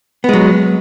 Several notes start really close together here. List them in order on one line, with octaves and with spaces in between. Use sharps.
B3 G#3 F#3